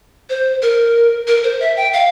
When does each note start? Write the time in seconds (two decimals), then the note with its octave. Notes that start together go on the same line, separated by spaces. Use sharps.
0.30 C5
0.62 A#4
1.28 A#4
1.44 C5
1.60 E5
1.77 G5
1.93 F5